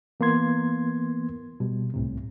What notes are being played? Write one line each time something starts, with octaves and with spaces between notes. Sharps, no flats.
E3 A#3 B3 C6 G#6
B2 G3
C2 A2 C3